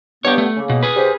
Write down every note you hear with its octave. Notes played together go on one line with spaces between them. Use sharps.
G2 B3 G4 C#5
A3
C#3 A#3
B2
G#4 B4
C#3 G4 C5